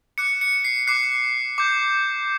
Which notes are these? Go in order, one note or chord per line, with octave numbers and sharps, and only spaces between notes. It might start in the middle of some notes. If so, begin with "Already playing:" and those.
D6 F#6 C#7
C#7
C7
D6 F#6 C7
D6 G6